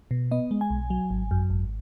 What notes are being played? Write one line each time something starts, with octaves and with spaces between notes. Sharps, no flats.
B2
B3 D#5
G#3
G#5
B1
F#3
G#1
F#2
G#1